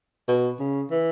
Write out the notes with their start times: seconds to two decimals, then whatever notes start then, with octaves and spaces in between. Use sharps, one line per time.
0.28 B2
0.60 C#3
0.91 E3